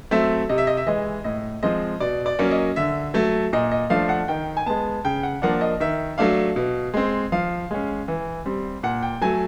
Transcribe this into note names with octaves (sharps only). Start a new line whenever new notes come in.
F#3 A3 C4 E5
C3 D#5
E5
D#5
E5
E3 G#3 D#5
A2 D#5
F3 G#3 C4 D#5
B2 D5
D5
F#3 A#3 C#4
D#5
D3 E5
F#3 A3
A#2 D#5
D#5
F3 A3 D4 F5
F#5
D#3 G5
G#5
G#3 B3 A5
C#3 G5
F#5
F3 A#3 D4 F#5
D#5
D#3 E5
F#3 A3 D4 F5
B2
G#3 C4
F3 F5
G#3 C#4
E3
G3 C4
A#2 F#5
G5
F#3 A3 G#5